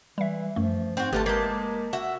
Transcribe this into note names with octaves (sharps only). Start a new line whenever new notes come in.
E3 G3 E5
F#2 F3 A3
G#2 C4 F#4
G1 D3 A3 F4 G4 B4 A5
G#3 A#3 A5 G6 G#6 B6
F#4 E5